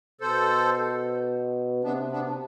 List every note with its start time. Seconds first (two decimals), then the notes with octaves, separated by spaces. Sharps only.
0.21 B2 A4 C5
1.84 C3 B3 D4
2.11 B3 D4